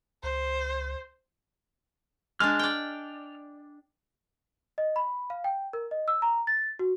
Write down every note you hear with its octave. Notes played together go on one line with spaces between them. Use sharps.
C#2 C5
G#3 D4 F6
D5 G5
D#5
B5
F5
G5
A#4
D#5
E6
A#5
A6
F#4